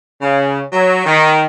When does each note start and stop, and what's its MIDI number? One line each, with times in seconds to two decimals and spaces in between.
0.22 0.61 49
0.73 1.05 54
1.06 1.45 51